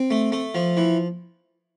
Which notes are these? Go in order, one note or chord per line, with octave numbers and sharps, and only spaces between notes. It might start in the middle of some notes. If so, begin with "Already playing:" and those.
Already playing: C4
A3
A3
F3
E3